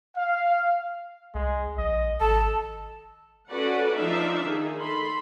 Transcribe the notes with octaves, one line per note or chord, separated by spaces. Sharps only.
F5
C2 G#3
A#1 D#5
G#1 A4 A5
C#4 F#4 A4 B4 D5 F#5
F3 D4 D#4 E5 F5
D#3 D#4 G#4
A4 B5 C6